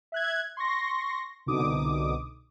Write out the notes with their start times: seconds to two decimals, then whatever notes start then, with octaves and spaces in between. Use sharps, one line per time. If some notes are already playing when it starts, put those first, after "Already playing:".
0.12 E5 F#6 G#6
0.57 C6 C#6 A#6
1.46 C2 B2 D3 D#4 D6 D#6